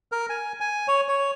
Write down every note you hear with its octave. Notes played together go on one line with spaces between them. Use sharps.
A#4
G#5
G#5
C#5
C#5